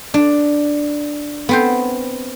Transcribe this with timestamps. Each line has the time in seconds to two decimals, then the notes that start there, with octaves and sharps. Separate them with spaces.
0.14 D4
1.49 B3 C4 C5